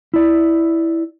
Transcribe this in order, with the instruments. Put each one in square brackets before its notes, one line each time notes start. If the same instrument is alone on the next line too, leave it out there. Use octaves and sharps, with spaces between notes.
[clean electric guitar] E4 D5